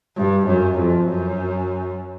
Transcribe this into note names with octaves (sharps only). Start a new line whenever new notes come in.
G2
F#2
F2
F#2